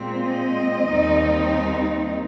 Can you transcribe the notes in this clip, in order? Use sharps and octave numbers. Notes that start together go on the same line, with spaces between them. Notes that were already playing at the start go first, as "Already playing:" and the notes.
Already playing: A#2 G#3 C4
D#5
D#2 D#3 G3 C4 D#4